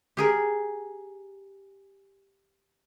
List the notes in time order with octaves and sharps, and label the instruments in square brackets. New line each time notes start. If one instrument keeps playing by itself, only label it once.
[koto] G4 G#4 A#4